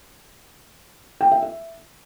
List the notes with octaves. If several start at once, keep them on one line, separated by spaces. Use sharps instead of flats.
G5
E5
E5